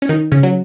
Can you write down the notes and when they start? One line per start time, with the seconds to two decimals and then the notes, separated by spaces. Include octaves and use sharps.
0.02 C#4
0.09 D#3 D#4
0.32 C#3 C#4
0.43 F#3